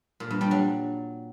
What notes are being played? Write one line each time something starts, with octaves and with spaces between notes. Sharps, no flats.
A#2
G2
G3
F#3